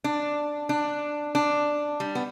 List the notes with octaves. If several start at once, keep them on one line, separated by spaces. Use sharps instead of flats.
D4
D4
D4
G3
B3